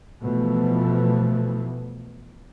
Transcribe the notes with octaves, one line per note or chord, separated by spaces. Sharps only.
B2 E3 F3 A3